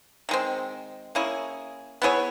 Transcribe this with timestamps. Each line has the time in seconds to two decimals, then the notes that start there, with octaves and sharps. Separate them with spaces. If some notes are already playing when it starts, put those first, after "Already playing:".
0.29 D#3 G#3 C4
1.15 A#3 C#4 E4 G#4
2.02 B3 E4 G#4 C#5